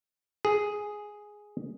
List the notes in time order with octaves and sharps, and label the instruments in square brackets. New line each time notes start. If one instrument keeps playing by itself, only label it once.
[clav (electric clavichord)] G#4